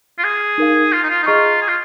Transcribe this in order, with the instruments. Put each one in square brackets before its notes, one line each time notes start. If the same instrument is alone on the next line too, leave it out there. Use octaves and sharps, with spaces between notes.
[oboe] F4
G#4
[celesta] D#4 A#4 F5
[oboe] F4
D#4
F4
D#4
[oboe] F4 [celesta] G#4 D#5 A#5 C#6
[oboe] G#4
F4